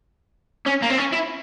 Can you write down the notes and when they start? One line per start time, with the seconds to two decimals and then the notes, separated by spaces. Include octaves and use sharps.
0.66 C#4
0.82 A#3
0.90 C4
0.98 C#4
1.13 E4